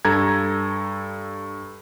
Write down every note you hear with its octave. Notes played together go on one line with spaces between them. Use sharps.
G2 A4 A#5 G#6